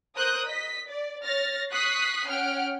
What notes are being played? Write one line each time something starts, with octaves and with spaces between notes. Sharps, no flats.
A#4 C5 D#6 F#6 G6
D#5 B6
D5
C#5 F6 A6 A#6
C#6 D#6 F#6 B6 C7
C#4 F#5 G5 F6 D7